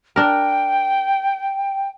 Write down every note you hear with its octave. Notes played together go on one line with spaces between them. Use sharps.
D4 A#4 G5